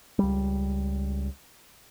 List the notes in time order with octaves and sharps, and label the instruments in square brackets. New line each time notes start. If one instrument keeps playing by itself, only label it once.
[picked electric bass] C#2 G3